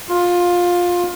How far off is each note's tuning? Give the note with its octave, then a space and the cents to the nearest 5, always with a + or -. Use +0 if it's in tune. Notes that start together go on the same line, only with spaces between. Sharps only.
F4 +15